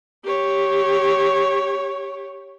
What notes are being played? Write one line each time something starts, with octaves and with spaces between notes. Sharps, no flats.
G4 C#5